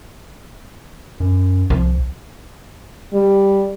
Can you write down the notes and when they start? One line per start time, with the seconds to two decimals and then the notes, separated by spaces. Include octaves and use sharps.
1.20 F#2
1.70 C2 F3
3.13 G3